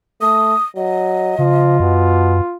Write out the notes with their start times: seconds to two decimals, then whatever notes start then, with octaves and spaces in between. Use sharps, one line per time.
0.21 A3 D#6
0.76 F#3 D#5
1.39 C#3 F3 F4
1.80 F#2 B2